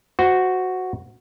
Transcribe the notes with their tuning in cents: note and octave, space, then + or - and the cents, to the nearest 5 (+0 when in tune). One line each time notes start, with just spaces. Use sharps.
F#4 +0 C5 -20